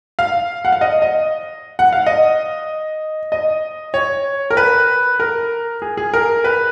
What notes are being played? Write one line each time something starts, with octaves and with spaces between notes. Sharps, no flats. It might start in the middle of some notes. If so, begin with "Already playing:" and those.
F5
F#5
F5
D#5
D#5
F#5
F5
D#5
D#5
C#5
A#4
B4
A#4
G#4
G#4
A#4
B4